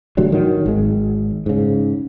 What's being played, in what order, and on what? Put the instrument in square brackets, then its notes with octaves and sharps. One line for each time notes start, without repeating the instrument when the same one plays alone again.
[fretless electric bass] A2 D3 F#3 G3
D#3 F#3
G#1 G#3
G#2 C#3